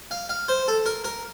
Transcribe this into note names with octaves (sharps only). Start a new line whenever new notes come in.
F5
F5
C5
A4
A#4
A#4